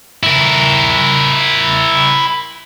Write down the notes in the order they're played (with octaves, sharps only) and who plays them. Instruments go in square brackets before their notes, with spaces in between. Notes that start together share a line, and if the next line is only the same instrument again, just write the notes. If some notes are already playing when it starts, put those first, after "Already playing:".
[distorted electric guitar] E4 A#4